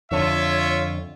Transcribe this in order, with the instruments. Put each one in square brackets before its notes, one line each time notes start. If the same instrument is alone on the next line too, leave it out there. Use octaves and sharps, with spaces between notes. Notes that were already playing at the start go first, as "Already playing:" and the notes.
[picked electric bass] F2 D3 [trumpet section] F4 E5 C#6 [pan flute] C#5